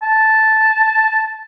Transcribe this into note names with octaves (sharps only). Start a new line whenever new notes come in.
A5